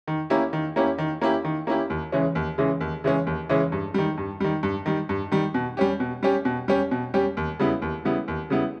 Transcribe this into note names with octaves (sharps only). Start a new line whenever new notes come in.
D#3
A#3 C#4 E4 G4
D#3
A#3 C#4 E4 G4
D#3
A#3 C#4 E4 G4
D#3
A#3 C#4 E4 G4
D#2
C#3 E3 G#3 C#4
D#2
C#3 E3 G#3 C#4
D#2
C#3 E3 G#3 C#4
D#2
C#3 E3 G#3 C#4
G2
D#3 G3
G2
D#3 G3
G2
D#3 G3
G2
D#3 G3
B2
G3 C#4 G4
B2
G3 C#4 G4
B2
G3 C#4 G4
B2
G3 C#4 G4
D#2
C#3 G3 B3 E4
D#2
C#3 G3 B3 E4
D#2
C#3 G3 B3 E4